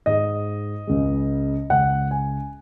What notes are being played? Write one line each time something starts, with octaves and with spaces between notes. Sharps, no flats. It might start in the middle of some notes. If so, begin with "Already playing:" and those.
G#2 G#3 D#5
C#2 C#3 G#3
C#2 C#3 G#3 F#5
G#5